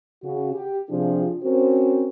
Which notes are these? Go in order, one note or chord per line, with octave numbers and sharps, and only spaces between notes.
C#3 F#4
G4
C3 F3 D4 F4 G4 G#4
C4 C#4 F#4 A#4 C5